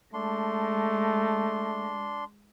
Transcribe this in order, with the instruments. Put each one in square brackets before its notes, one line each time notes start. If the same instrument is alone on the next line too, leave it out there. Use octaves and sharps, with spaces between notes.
[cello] G#3 [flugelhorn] A3 [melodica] D4 C6